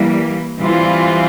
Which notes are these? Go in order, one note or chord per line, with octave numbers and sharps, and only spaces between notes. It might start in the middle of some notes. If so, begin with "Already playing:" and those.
Already playing: E3 G3 A#3
E3 G3 C4 F4